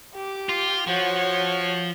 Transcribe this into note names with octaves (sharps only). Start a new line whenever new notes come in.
G4 D6
F4
F3 F#4 C#5